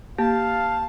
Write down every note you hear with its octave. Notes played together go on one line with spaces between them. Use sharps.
A#3 G4 F5 A5